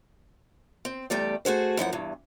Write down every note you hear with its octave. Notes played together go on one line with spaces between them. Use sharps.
C4
E2 G3 A3 D5
A3 F#4 G#4 C5
F#2 E3 F3 F#5
E2 G2 E3